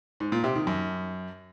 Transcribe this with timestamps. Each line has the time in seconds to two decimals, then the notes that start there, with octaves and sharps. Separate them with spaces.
0.20 G#2
0.32 A#2
0.44 C3
0.55 D#3
0.67 F#2